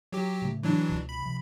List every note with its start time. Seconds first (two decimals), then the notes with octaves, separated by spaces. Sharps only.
0.12 F#3 G4
0.42 A2 C#3 A3
0.63 E3 F#3 D4
0.89 C#2 B2
1.09 B5
1.22 C3 F3